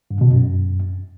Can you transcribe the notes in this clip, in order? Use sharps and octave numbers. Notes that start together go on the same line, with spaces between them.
G2
B2
F#2